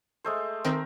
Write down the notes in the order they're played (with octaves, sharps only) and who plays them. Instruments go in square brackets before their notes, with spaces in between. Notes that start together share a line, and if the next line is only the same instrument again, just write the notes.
[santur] G#3 A3 C5
[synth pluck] D#3 C4 [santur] A#4